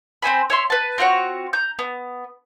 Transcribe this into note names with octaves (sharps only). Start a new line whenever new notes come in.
C4 C5 G#5 B5
C#5 E5 C6
B4 A5
C4 F4 F#4 C#5
A#5 G6
B3